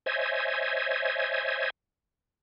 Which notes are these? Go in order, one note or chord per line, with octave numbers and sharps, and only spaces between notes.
C5 C#5 D#5 E5 G#5